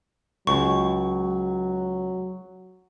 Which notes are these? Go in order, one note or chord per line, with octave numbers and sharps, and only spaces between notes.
C#2 F#3 C#6